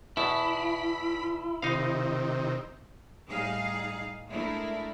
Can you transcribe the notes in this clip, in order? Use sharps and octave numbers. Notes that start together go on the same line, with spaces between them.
E2 B2 E4 B5
C3 D#3 D#4 F5
A2 G3 D#4 G#4 F5
G#3 A3 D4 E4 A#4